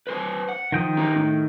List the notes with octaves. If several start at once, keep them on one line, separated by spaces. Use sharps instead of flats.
B4 C5 G#5
F#5
D#3 F3 G5 D#6
C#4 G4 A#5
A2